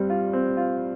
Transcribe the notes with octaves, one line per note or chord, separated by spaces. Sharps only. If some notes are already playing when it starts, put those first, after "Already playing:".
Already playing: G2 G3 C4
F4
C4
F4